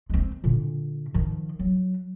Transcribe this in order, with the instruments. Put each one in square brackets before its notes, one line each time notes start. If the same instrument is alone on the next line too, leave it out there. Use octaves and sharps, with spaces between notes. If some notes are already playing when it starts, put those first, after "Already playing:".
[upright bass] G#3 C4
A#2 D3
D#3 F3
F#3